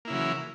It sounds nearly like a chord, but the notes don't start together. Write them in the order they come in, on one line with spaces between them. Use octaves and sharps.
A#3 E4 C#3 F#3 E3